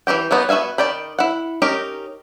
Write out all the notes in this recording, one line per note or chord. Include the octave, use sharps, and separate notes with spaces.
E3 F#3 G4 G5
E3 F#3 B3 D#4
B3 F#4 E5 F5 G#5
D#3 D5 G5 B5
E4 F#5
C#4 D#4 G4 A#4